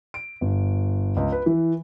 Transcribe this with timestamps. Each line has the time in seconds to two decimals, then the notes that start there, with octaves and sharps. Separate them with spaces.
0.14 D7
0.41 G1
1.17 C#2
1.32 B4
1.46 E3